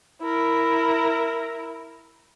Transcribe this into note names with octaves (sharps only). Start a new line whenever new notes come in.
E4 A#4